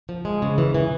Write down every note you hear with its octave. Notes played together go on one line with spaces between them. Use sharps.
F3
G#3
C#3
E3
E3